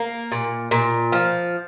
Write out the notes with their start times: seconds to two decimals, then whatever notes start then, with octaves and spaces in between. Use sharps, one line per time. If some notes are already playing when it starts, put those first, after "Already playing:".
Already playing: A#3
0.32 A#2
0.71 A#2
1.12 F3